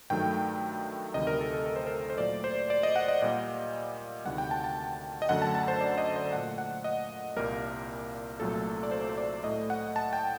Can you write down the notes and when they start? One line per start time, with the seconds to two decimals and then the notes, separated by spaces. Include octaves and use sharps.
0.10 G2 D#3 F#3 A3 G5
1.14 D2 C3 D#3 G3 D#5
1.27 A#4
1.41 A4
1.53 A4
1.66 A#4
1.76 C5
1.86 A#4
2.10 C5
2.18 A#2 F#3 A3 D5
2.44 C5
2.70 D5
2.83 D#5
2.96 F#5
3.08 D#5
3.22 A#2 G3 A#3 D#5
4.25 D2 C3 D#3 G3 F#5
4.38 G5
4.51 A5
4.64 A5
5.22 D#5
5.29 F#2 D3 F#3 A3 F#5
5.42 A5
5.55 A5
5.68 C5
5.81 D5
5.98 D#5
6.16 C5
6.32 A#2 A3 F#5
6.58 F#5
6.84 D#5
7.36 C2 A#2 G3 A#3 A#4
8.40 C2 A#2 F#3 A3 A4
8.83 D5
8.91 C5
9.09 C5
9.18 D5
9.44 A2 A3 D#5
9.70 F#5
9.96 A5
10.13 G5